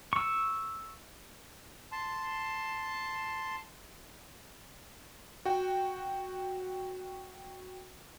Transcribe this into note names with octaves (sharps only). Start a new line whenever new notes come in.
C#6 E6
A5 C6
F#4 G5